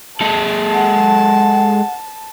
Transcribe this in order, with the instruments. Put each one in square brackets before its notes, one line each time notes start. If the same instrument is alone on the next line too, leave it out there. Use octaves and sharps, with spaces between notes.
[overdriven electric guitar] G#3 A4 [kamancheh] A5
[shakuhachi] F#5